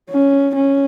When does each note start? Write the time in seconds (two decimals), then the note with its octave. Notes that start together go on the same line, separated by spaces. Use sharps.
0.10 C#4
0.56 C#4